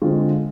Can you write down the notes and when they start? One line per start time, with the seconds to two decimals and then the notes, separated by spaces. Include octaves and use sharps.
0.02 D3 G#3 C4 F4